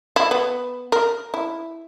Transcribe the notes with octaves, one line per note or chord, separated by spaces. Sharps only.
E4
B3
A#4
E4